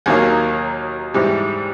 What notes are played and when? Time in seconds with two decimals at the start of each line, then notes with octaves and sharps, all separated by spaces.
0.06 D#2 D#3 F#3 A#3
1.14 G#2 E3 G3